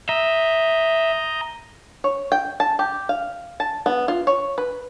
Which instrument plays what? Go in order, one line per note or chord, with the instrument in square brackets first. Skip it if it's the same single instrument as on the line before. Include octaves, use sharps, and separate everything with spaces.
[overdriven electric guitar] E5 [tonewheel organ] A#5 D#6 G6
[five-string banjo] C#5
G5
A5
G4
F5
A5
B3
F4
C#5
B4